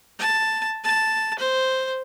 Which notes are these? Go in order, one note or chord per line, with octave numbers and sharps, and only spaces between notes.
A5
A5
C5